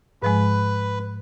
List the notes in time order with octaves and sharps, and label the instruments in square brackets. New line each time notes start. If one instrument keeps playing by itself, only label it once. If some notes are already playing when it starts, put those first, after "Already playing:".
[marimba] G#2 F3 G#3 [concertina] B4